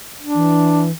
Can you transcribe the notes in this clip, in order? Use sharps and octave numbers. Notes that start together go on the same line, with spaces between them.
D4
E3